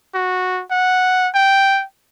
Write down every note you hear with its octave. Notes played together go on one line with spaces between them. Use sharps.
F#4
F#5
G5